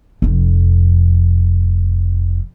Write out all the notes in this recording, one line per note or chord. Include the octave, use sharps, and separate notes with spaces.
F1 F2